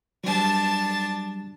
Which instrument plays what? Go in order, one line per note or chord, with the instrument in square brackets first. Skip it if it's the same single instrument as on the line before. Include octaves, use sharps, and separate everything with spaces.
[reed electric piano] F#3 G3 [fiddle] D4 A5